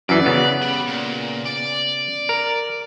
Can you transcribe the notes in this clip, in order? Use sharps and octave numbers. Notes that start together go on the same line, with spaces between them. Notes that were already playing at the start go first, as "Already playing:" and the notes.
F#2 E3 D5
C#3 B3
G4 B5
A#2
D5
A#4